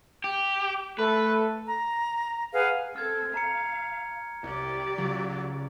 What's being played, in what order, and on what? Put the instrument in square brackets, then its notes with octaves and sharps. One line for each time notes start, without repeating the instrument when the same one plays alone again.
[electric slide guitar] G4
[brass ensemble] A3 A4 [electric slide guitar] B4
[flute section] A#5
G#4 B4 F5 F#5
[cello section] C4 A4 [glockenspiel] F6 G#6
[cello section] F5 [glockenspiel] A5 A#5 C#7
[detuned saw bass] C2 [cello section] G4 D5
[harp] C#2 [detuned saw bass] F#3